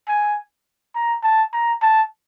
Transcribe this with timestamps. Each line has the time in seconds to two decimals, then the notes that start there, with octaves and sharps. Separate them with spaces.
0.09 G#5
0.96 A#5
1.24 A5
1.53 A#5
1.82 A5